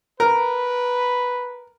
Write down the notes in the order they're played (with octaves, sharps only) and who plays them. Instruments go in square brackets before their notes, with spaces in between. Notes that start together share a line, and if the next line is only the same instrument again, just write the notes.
[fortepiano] A#4 [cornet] B4